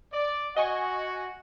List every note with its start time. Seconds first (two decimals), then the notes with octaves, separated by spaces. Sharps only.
0.11 D5
0.57 F#4 D#5 F#5 G#5 C#6